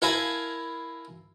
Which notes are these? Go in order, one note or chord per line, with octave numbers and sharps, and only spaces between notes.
E4 A#4 F5 G#5 A5 B5